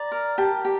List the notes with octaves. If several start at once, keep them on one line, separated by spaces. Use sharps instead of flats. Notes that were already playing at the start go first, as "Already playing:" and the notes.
Already playing: D5 A#5
A#4
G4 A5
G4